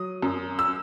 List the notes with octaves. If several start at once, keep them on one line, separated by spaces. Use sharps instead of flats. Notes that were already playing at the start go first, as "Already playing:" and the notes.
Already playing: F#3 D#6
F#2
E6